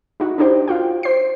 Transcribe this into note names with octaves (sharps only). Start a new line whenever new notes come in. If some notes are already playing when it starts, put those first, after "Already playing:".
D#4 E4 F#4
D4 D#4 G4 C5
F4 F#4 G5
C5 C7